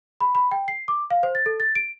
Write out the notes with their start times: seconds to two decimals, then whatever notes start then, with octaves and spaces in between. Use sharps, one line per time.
0.21 B5
0.35 B5
0.51 G5
0.68 C7
0.88 D6
1.10 F5
1.23 C5
1.35 A6
1.46 A4
1.60 A6
1.75 D7